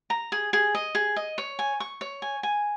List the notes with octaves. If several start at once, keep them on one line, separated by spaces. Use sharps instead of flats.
A#5
G#4
G#4
D#5
G#4
D#5
C#5
G#5
C#6
C#5
G#5
G#5